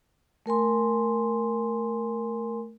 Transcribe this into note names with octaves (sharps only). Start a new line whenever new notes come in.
A3 A#4 G#5 C6